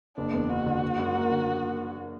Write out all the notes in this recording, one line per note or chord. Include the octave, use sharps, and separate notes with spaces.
F#1 D4
E2
F#1 F#4
D3
F#1
F#2
A#3
D3